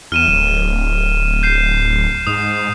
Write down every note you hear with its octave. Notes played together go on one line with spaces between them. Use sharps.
E2 F6 D#7 E7
D1 E7
G6 C7 E7
G#2 D#6